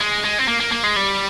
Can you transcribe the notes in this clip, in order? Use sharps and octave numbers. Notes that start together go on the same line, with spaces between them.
G#3
G#3
C4
A#3
A#3
A#3
G#3
G3